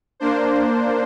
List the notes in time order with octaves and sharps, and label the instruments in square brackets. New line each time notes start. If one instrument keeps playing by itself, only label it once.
[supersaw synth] A#3 D4 C5